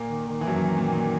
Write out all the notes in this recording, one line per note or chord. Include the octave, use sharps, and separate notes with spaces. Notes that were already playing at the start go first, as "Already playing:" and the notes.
Already playing: A#2 A#3
D#3
D#3
E3
F#2 F#3
A#2
A#2